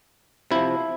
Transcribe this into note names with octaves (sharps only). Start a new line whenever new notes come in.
C3 F3 E4